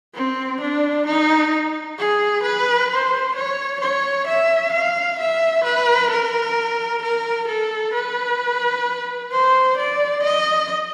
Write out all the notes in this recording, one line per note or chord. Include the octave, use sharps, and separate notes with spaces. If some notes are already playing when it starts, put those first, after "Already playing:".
C4
D4
D#4
G#4
B4
C5
C#5
C#5
E5
F5
E5
B4
A#4
A#4
A4
B4
C5
D5
D#5